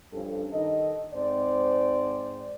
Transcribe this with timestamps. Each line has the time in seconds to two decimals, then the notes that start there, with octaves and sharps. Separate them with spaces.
0.13 G2 F3 C#4 D4 A4
0.51 D#3 D#4 A4 D#5
1.13 G#2 C4 C5 D5